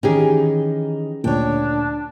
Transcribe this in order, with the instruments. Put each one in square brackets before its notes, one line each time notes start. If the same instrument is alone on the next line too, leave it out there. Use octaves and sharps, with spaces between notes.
[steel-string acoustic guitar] D#3 E3 D#4 [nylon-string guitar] C#4 G4 G#4
[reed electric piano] D2 A#2 [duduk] D4 [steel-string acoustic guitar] C#5 G5